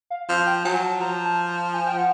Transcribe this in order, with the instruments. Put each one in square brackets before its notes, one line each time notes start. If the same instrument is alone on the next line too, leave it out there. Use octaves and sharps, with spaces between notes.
[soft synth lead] F5
[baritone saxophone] F3 [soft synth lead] F5
[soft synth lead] G5
[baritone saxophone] F#3 [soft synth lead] G#5
[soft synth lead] A5
[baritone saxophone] F3 [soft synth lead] A#5
[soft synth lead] A5
A5
G#5
G5
F#5